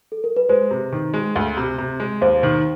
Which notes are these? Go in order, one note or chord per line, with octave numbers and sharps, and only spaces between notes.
A4
A#4
B4
G#3 C5
C3
D#3
G#3
D2
C3
C3
G#3
D#2 C5
D#3